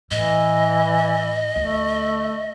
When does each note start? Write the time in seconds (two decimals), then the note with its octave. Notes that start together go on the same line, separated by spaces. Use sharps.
0.11 A2 E3 D#5
1.56 D2 A3